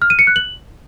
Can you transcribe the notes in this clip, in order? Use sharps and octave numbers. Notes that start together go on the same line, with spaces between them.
F6
D#7
C#7
F#6
F#7